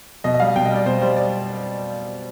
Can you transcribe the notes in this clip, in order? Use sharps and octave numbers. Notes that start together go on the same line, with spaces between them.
B2 D#5
D#5
G3 F5
B2 G5
D#5
G3 D5
B2 C5
G3 C5
D5